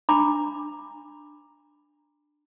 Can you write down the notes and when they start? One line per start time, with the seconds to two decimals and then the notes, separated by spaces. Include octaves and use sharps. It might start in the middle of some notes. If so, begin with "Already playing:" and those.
0.09 D4 A#5 B5 D6